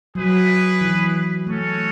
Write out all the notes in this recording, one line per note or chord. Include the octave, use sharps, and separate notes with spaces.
F#3 E4 G#4 B4
E3
A3 C#4 F#4 A4 C#5